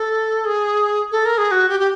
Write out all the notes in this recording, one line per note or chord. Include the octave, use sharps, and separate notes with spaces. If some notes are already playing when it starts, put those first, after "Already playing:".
Already playing: A4
G#4
A4
A#4
G#4
F#4
G4
G4